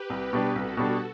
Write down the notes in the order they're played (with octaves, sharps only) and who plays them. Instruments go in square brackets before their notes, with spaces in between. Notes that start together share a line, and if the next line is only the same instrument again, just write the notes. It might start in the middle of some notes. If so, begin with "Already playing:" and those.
Already playing: [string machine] G4 B4
[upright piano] C2
B2 G3 D4
[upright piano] C2 [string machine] F#4 A4
[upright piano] B2 G3 D4